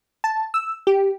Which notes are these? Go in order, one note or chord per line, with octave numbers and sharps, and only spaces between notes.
A5
E6
G4